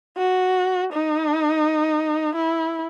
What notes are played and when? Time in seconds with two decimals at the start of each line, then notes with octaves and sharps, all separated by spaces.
0.18 F#4
0.93 D#4
2.35 E4